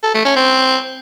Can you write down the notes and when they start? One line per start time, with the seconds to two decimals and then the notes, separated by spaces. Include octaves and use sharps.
0.03 A4
0.14 A3
0.25 C#4
0.36 C4